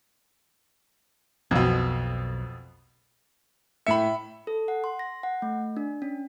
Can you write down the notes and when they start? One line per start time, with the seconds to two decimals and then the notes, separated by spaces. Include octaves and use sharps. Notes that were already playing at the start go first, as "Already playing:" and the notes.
1.51 B1 F2 B2
3.87 A2 E5 B5 C#7
4.47 A4
4.68 F#5
4.84 C6
4.99 A#6
5.23 F#5
5.42 A3
5.77 D4
6.02 C#4